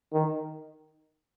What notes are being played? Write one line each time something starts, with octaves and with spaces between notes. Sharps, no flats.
D#3